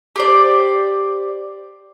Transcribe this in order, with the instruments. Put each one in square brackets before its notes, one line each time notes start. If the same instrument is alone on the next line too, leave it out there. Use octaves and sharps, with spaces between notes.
[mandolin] G4 C5 D5